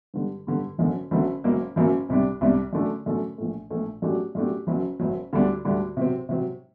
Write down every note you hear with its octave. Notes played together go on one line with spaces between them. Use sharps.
G2 D3 G3
G2 D3 G3
F#1 F#2 D3 F#3
F#1 F#2 D3 F#3
F#1 F#2 F#3 A#3
F#1 F#2 F#3 A#3
C2 C3 G3 D4
C2 C3 G3 D4
F#2 D3 A3 D4 A4
F#2 D3 A3 D4 A4
A#1 A#2 A3
A#1 A#2 A3
F#2 F#3 A3 D4 G4
F#2 F#3 A3 D4 G4
F#1 F#2 F#3
F#1 F#2 F#3
D2 D3 G3 D4
D2 D3 G3 D4
C3 F#3 C4
C3 F#3 C4